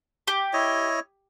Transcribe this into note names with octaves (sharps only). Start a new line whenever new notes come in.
G4
E4 C#5 D#5